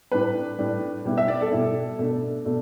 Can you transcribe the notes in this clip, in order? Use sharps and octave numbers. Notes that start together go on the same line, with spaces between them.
A2 G3 D4 B4
A2 G3 D4
B2 G3 E4
E5
D5
A4
B2 G3 E4
B2 A3 D4
B2 A3 D4